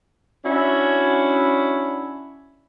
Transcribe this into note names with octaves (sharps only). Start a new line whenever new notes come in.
C#4 D4 E4 F#4